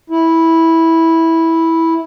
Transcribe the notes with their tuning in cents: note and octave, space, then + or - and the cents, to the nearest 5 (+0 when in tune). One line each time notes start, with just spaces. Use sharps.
E4 -10